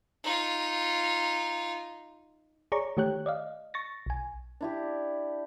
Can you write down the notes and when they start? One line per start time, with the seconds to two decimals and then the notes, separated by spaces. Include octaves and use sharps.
0.24 D#4 F4
2.72 G#4 C#5 D5 A#5 C#6
2.97 D#3 A3 G4 C#5 G5 F#6
3.26 D5 D#5 F5
3.74 C#6 A6 A#6
4.06 B1 G#5
4.61 D4 E4 G4